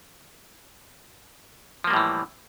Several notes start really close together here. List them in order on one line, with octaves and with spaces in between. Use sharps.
F3 A#3 G3 A2 E3